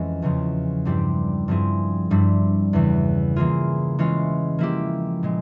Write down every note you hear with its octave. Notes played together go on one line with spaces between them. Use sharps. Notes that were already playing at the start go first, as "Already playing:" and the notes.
Already playing: F2 E3 G#3 C#4
E2 C#3 F3
G2 G3 C4 E4 G4
G2 F3 C4 E4 G#4
G2 G3 C4 E4
E2 C#3 E3
E3 A#3 F4 G#4
E3 G#3 C#4 F4
F3 A#3 E4 G4
A#2 G#3